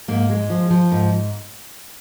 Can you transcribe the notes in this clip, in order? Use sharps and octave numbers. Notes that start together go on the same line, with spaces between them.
G#2 A#3
G#3
F3
F3
G#2